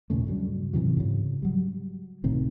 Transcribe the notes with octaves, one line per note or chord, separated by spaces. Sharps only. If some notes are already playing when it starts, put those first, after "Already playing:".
D#2 A#2 C#3 A3
G2 C#3 F#3
G#2 C3 E3 F#3
G#2 C#3
F#3 G3
C#2 A2 C3 D#3